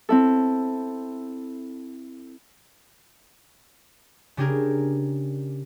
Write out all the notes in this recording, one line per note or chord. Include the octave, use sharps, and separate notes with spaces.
C4 E4 A4
C#3 D4 G4 G#4 A#4